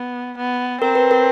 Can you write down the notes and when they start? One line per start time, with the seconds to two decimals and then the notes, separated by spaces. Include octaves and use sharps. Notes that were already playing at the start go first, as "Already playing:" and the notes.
Already playing: B3
0.37 B3
0.81 C4 A#4
0.95 B4
1.11 A#4